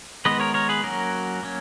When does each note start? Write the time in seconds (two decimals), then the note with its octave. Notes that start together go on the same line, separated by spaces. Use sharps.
0.25 D#3 G#3 B3 B4 D#5
0.40 A#4 C#5
0.54 A#4 C#5
0.69 G#4 B4
0.84 F#3 A#3 C#4 F#4 A#4
1.43 F#3 A#3 C#4